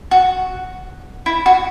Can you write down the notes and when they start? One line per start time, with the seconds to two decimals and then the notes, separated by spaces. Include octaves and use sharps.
0.11 F#4
1.26 E4
1.46 F#4